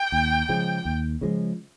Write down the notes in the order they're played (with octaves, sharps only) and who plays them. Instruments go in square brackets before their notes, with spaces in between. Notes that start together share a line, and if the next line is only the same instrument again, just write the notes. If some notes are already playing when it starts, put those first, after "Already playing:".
Already playing: [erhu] G5
[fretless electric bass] D#2
C#3 F3 G#3
D#2
C#3 F3 G#3